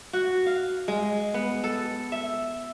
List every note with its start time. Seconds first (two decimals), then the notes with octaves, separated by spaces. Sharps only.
0.13 F#4
0.46 F5
0.88 G#3
1.34 B3
1.64 A4
2.12 E5